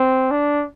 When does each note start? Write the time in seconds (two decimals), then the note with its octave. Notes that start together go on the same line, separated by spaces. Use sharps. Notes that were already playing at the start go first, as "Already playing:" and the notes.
Already playing: C4
0.31 D4